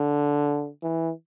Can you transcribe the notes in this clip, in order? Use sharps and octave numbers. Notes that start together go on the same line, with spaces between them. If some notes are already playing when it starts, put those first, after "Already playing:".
Already playing: D3
E3